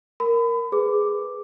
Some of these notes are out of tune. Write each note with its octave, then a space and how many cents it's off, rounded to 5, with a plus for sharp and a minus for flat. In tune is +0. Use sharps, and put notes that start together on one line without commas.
A#4 +0 B5 +35
G#4 +0 B4 +10 D6 +0